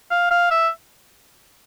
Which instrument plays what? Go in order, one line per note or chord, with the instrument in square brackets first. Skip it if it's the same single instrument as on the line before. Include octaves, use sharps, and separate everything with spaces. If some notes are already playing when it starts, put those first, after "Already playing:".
[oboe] F5
F5
E5